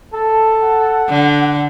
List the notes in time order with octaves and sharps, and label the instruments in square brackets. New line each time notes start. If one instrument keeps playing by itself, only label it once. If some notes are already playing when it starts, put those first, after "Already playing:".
[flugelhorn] A4 [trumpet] A5
[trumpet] F#5
[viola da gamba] D3